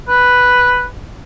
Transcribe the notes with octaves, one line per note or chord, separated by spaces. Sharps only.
B4